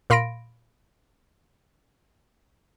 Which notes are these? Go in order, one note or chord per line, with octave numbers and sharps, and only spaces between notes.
A#2 F5 B5 C6 A#6 D7